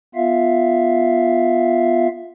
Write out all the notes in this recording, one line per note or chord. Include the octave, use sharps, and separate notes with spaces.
B3 F4 E5 F5